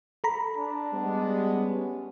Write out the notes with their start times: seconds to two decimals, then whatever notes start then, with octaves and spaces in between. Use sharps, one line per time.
0.24 A4 A#5 B5
0.57 D4
0.93 G3 G#3 B3
1.53 C#4